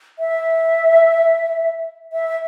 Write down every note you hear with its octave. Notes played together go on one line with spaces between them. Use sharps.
E5
E5